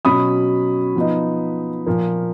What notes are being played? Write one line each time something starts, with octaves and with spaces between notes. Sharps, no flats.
B2 F#3 C#4 B5 D#6
F3 B3 D#4
A#2 F3 A#3